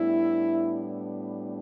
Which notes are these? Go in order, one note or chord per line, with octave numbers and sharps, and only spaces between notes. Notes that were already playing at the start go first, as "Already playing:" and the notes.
Already playing: A2 G3 B3 D4 E4